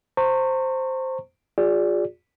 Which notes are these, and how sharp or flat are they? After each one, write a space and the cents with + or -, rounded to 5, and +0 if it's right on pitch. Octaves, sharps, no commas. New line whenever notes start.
C5 +0 A#5 -40 C#6 -15
F4 +35 G#4 -20 D5 -15